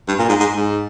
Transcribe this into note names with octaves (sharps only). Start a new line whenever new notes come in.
G2
A#2
G#2
G#2
G#2